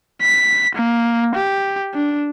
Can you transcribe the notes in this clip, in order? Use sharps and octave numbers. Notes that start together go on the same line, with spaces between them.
B6
A#3
G4
D4